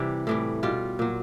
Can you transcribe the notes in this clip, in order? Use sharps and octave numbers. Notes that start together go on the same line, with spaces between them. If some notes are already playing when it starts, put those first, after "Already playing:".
Already playing: C3 E3 G3
A2 E3 G3
B2 G3 F4
A#2 F#3